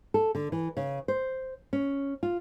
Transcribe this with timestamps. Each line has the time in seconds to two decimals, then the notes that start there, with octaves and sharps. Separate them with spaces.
0.14 A4
0.35 D3
0.52 E3
0.77 C#3
1.08 C5
1.73 C#4
2.23 F4